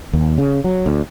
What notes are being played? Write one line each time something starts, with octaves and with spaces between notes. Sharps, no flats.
D#2
C#3
F#3
D2